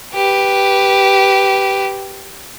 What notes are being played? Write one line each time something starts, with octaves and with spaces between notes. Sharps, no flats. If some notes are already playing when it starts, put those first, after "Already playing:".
G4 B4